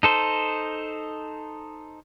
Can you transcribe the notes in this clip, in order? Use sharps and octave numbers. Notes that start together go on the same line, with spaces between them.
D#4 A4 C5